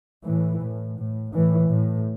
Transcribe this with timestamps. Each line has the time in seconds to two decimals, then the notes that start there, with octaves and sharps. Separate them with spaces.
0.24 A2 E3
0.60 A2
0.97 A2
1.33 A2 E3
1.70 A2